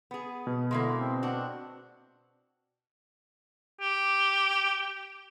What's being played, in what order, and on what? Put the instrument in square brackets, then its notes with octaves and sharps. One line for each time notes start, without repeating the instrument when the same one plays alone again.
[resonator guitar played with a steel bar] B3 G#4
[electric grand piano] B2
[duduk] D3 [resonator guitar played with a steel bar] G#3 A#3 E4
[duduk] C4
[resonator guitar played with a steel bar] D4 F#4
[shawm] G4